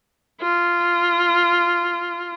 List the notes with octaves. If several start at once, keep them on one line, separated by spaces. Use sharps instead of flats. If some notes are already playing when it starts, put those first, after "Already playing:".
F4